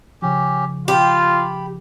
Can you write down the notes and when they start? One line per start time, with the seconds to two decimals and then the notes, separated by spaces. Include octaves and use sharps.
0.22 C#3 F3 C#4 G4
0.88 F4 G4 B5